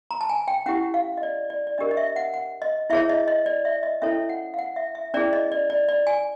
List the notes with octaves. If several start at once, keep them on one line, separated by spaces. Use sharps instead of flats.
A#5
A5
G#5
G5
C#4 E4 G4 F#5
F5
D#5
D5
D5
D5
D4 G4 A#4 D#5
D#5
E5
F#5
F#5
D#5
E4 G#4 C#5 E5
D#5
D#5
D5
E5
D#5
C#4 E4 A4 C#5 E5
F#5
F5
F#5
E5
E5
C#4 E4 G#4 D5
D#5
D5
D5
D5
G#5